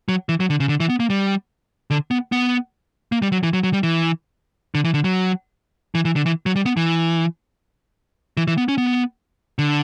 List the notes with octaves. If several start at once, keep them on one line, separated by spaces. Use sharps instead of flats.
F#3
E3
F#3
D3
C#3
D3
E3
B3
A#3
G3
D3
B3
B3
A#3
G3
F#3
E3
F#3
F#3
G3
E3
D3
E3
D3
F#3
E3
E3
D3
E3
F#3
G3
B3
E3
E3
E3
B3
C#4
B3
D3